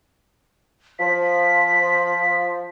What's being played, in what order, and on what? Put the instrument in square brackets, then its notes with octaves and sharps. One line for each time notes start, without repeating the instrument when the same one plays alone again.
[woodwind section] F3 [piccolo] B6